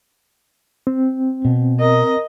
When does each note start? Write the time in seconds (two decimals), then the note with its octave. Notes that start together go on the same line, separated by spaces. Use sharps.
0.87 C4
1.45 B2
1.81 A#4 D#5